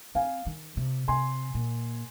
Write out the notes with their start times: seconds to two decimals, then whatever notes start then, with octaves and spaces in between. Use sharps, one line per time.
0.15 C4 F5 G#5
0.46 D#3
0.77 C3
1.08 C3 G#5 C6
1.55 A#2